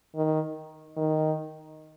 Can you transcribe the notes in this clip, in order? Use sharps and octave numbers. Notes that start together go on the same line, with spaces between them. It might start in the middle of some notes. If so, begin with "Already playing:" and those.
D#3
D#3